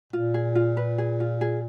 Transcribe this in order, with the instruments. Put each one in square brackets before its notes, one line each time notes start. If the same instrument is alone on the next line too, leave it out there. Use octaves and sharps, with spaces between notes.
[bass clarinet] A#2 [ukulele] F4
[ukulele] G#4
F4
B4
G#4
F4
G#4